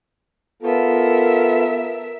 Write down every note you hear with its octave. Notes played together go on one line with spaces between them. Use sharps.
B3 F4 A4 A#4 E5